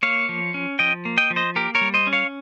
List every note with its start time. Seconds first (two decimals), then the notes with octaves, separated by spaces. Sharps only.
0.03 A#3 C#5 F5
0.29 F3
0.54 C#4
0.79 F3 D#5 G5
1.05 A#3
1.18 D#5 G5
1.30 F3
1.36 C5 D#5
1.56 A#3 G4 A#4
1.75 A#4 C#5
1.81 G3
1.94 C5 D#5
2.07 C#4
2.13 C#5 F5